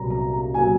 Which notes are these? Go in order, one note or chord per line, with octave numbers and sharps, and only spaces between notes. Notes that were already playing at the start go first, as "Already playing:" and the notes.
Already playing: C2 A#2 F#3 A#5
A#5
A#5
A#2 F#3 G#5